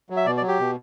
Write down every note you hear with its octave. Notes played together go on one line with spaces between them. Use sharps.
F#3
E5
B2 D5
D5
F#3
G4
B2